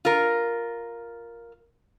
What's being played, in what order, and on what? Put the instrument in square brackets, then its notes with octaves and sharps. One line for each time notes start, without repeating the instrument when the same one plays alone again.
[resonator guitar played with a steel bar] F4 A#4